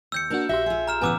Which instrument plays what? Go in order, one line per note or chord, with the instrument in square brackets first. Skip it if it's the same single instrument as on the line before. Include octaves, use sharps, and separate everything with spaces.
[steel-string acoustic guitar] D#2 [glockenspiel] E6 G6 C#7
[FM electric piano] A#3 D4 F#4 [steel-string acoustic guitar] A#4 A5
[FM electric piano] A#1 G4 C6 [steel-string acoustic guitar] F#4 [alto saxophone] E5
[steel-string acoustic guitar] F4 G#4
[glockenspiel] A#5 F6 E7
[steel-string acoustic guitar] A2 C#3 E3 [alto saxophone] B3 [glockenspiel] G#5 D6 E6